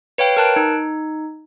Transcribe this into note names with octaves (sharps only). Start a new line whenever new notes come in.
B4 C#5 F5 G5
A#4 A5 F#6 D7
D#4